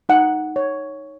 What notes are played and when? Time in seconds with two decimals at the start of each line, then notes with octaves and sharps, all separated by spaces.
0.09 D#4 F#5
0.56 C#5